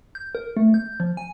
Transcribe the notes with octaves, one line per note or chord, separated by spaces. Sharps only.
G6
A#4
A3
G6
F3
G#5